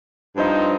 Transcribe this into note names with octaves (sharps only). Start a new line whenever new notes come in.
G2 F3 C4 D#4